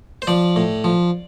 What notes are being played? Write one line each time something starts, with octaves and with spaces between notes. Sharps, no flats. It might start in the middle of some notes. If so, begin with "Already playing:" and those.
C5
F3 D5
A2
F3